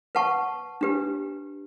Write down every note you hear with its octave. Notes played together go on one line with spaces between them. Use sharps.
B4 F#5 A5 C#6
D4 G4 B4